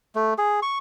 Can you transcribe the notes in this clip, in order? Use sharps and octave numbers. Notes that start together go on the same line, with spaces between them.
A3
G#4
C#6